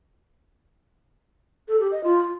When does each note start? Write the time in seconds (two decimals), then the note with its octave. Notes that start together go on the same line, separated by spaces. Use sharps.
1.68 A4
1.80 G4
1.92 D#5
2.04 F4